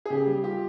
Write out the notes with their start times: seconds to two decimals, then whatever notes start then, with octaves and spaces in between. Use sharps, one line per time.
0.05 G#4
0.10 C#3 G4
0.27 G3
0.44 F4 G4